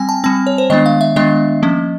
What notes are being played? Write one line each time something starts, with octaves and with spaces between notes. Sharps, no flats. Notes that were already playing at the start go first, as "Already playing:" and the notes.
Already playing: G3 C4 G5 G#5
A5
G3 C4 A5
C#5
C5
D#3 G#3 B3 D4 D#5
F5
E5
D#3 G#3 B3 D4 D#5
F3 A#3 C#4